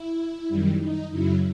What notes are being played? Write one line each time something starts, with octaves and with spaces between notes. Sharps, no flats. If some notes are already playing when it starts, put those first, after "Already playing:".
Already playing: E4
F#2 D#3 G3
D#4
F#2 C#3 F#3 E4